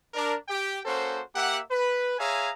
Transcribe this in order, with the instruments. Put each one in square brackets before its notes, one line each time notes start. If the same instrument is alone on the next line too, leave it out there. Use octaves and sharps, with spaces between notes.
[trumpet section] D4 A#4
G4 G5
A#3 C#4 F#4 A4 C5
A#3 G4 E5 F#5
B4
G#4 C#5 E5 F5 G#5 A#5